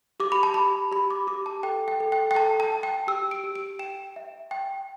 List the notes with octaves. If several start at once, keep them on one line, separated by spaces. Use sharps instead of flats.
G4 D6
B5
A5
G4 B5
G4 B5
D6
G4 D6
A5
A4 G5
G5
A4
G5
G5
A4 A5
A5
G5
G5
G4 E6
D7
G4
D7
G5 E7
E5
G5